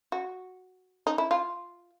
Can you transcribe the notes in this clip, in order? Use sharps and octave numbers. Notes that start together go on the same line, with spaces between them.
F#4
D#4
E4
F4